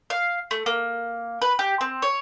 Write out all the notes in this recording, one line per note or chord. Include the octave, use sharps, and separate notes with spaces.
F5
A3
A#3
B4
G4
C4
C#5